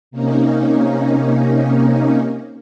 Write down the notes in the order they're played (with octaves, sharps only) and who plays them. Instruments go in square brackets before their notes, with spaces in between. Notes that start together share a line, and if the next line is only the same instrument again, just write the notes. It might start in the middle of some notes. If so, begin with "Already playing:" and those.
[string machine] C3 A#3 C#4 D#4